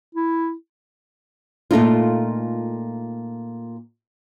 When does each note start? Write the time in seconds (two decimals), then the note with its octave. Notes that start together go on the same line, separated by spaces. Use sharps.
0.15 E4
1.71 A#2 A3 D#4 F4